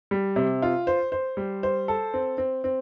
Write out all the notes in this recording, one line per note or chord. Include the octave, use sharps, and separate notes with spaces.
G3
C3
F4
C5
C5
G3
C5
A4
C4
C4
C4